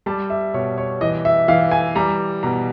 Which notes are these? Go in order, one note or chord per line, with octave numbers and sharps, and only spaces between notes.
G3 A5
E5
B2 C#5
C#5
E3 D#5
E5
E3 F5
G#5
G3 A#5
B2 A#5